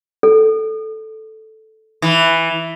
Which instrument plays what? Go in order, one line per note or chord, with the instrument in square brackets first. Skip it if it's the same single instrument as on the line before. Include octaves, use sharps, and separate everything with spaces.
[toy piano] A4
[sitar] E3